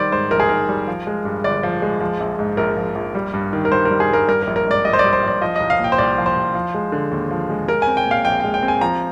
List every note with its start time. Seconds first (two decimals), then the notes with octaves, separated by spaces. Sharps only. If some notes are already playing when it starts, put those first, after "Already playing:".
Already playing: D#3 G3 C5 D5
0.12 G#2 C5
0.31 A#1 A#4
0.40 G#4
0.49 D#3 A#4
0.69 G3
0.88 F3
1.07 G#3
1.25 G2
1.44 G1 D5
1.63 F3
1.82 G#3
2.01 F3
2.20 A#1
2.39 G#2
2.57 A#1 A#4
2.77 F3
2.95 A#1
3.15 G3
3.33 G2
3.53 D#3
3.65 A#4
3.72 G2 C5
3.85 G3 A#4
4.00 G#4
4.09 G2 A#4
4.28 G3 A#4
4.42 A#4
4.47 A#1
4.56 A#4
4.66 G#2 D5
4.85 A#1 D#5
4.93 C5
4.99 D5
5.04 G3
5.13 C5
5.22 A#1
5.27 D5
5.41 F3 D#5
5.56 C2 D#5
5.70 F5
5.79 A#2
5.84 G5
5.92 C5
5.98 C2 D5
6.18 F3
6.26 C5
6.36 C2
6.54 F3
6.74 G#3
6.92 D3
7.11 D#2
7.31 F3
7.50 G#3
7.68 G#3 A#4
7.82 G#5
7.87 C4
7.97 G5
8.06 A#2
8.11 F5
8.25 A#1 G5
8.40 G#3 G5
8.54 G5
8.63 C4
8.68 G#5
8.81 F3 A#5